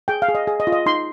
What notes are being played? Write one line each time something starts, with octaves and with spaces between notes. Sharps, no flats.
G#4 G5
F5
G#4
D#5
G#4
D#5
F4
D#5
D#4 C6